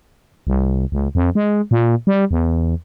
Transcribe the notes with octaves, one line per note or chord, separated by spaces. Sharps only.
C2
C#2
F2
G#3
A#2
G3
E2